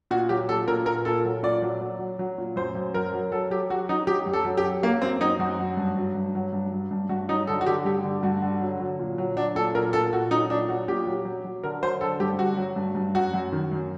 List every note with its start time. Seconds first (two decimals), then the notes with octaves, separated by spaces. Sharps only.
0.11 A#2 F#4
0.29 F#3 G4
0.49 A#2 A4
0.68 A#2 A#4
0.86 A#2 A#4
1.05 A#2 A4
1.24 F#3
1.43 A#2 D5
1.62 F#3
1.81 F#3
1.99 F#3
2.19 F#3
2.38 A#2
2.56 F#2 C5
2.75 F#2
2.94 F#3 A#4
3.13 F#3
3.31 F#3 A4
3.50 F#3 G4
3.70 F#3 F#4
3.89 F#3 D#4
4.07 F#3 G4
4.26 F#2
4.33 A4
4.45 F#3
4.57 G4
4.64 F#3
4.83 F#3 A#3
5.02 F#2 C4
5.21 F#3 D#4
5.39 F#2 F#4
5.59 F#3
5.77 G2
5.97 F#3
6.15 G2
6.35 F#3
6.53 G2
6.72 F#3
6.91 G2
7.09 G2 F#4
7.29 F#3 D#4
7.47 D3 A4
7.61 F#4
7.66 D3 G4
7.85 G2 G4
8.04 D3
8.23 G2 F#4
8.42 D3
8.62 F#3
8.80 F#3
8.99 A#2
9.18 F#3
9.37 F#3 D4
9.55 A#2 A4
9.75 A#2 A#4
9.93 A#2 A4
10.13 A#2 F#4
10.31 F#3 D#4
10.50 A#2 D4
10.69 F#3 F#4
10.88 A#2 G4
11.07 F#3
11.25 F#3
11.45 F#3
11.63 D3 A#4
11.83 F#3 C5
12.01 D3 A4
12.20 G2 G4
12.39 G2 F#4
12.57 F#3
12.76 G2
12.95 G2
13.14 F#2 F#4
13.34 F#2
13.52 D#3
13.72 F#2